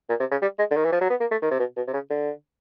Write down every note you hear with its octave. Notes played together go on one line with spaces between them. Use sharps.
A#2
C3
C#3
G3
G#3
D3
D#3
E3
F3
F#3
B3
A#3
A3
D#3
C3
B2
B2
C3
C#3
D3